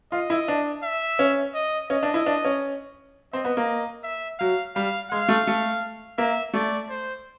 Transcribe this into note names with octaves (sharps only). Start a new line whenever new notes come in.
F4 D#5
E4
D4
E5
C#4
D#5
C#4 D#5
D4
E4
D4
C#4
C4 D#5
B3
A#3
E5
F#3 F5
G3 F5
G#3 F5
A3
A3
A#3 E5
A3 D5
C5